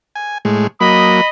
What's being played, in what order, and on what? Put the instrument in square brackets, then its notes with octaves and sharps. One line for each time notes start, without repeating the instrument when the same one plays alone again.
[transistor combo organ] G#5
A2 G#3
[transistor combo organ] F#3 A#3 [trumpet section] D#5 B5 D#6